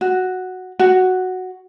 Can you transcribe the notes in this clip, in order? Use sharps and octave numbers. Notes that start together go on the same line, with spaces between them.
F#4
F#4